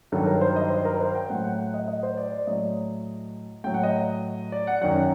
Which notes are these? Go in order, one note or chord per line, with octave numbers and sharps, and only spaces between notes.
G2 D#3 F#3 A4
A#4
C5
D#5
C5
A#4
C5
G5
A2 F#3 F#5
F#5
F#5
D#5
D#5
C5
D5
D5
A2 F#3 D#5
A2 F#3 G5
F#5
D#5
D5
F#5
F#2 D#3 F#3 F#5